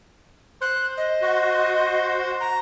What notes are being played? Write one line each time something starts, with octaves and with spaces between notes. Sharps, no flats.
C5 F#6
D#5
F#4
A#5